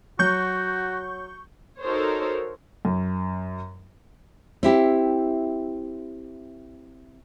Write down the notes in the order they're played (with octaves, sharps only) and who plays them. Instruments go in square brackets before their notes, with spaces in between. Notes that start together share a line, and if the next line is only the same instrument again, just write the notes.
[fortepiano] F#3 [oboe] F#4 [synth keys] C#6 G6
[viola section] D#4 F#4 A4 A#4 C5 C#5
[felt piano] F#2
[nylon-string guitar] C4 E4 G4